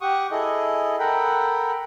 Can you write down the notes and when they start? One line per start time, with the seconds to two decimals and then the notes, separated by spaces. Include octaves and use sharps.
0.01 G4 F#5 C#6 D#6
0.31 E4 G#4 A4 D#5
0.99 A4 A#4 F#5 G5 B5